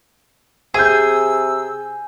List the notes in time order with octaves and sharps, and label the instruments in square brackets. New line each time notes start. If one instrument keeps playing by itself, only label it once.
[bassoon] C3 [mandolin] G#4 [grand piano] G#5 G6 [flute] E6